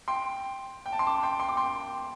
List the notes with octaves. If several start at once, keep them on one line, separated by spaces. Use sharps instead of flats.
G5 C6
G5
A5
C6
A5 D6
G5 C6
C6
D6
G5 C6